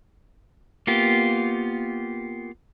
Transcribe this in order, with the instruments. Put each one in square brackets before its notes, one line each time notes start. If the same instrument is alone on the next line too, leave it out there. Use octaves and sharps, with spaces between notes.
[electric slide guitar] A#3 B3 F4 G4